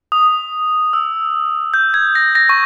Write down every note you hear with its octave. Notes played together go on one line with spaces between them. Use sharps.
D#6
E6
G6
G#6
A#6
A#6
C#6